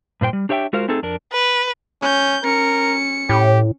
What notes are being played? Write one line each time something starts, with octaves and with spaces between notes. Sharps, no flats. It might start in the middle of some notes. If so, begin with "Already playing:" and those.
G2 A#2 C5 G5
G3
D4 G4 C#5 E5 F#5 G5
G#3 F4 F#4 A#4 C5 F5
A3 C4 D#4 G#4 A4
F2 D4 A#4
B4
C#4 G6
C#4 A#4 C#7
A2 G4